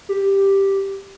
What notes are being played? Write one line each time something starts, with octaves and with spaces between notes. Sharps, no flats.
G4